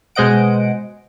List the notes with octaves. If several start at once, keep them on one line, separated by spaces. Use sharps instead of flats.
B2 G#3 C5 D#5 F#5 D7